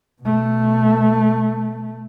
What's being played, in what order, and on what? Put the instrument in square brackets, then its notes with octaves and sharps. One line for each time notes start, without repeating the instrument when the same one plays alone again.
[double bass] B2 A3